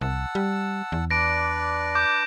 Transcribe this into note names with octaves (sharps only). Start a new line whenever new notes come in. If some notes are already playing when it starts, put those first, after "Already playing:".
C2 F#5 A5 E6
G3
E2
D4 B4 D5 A#6 D7
D6 G6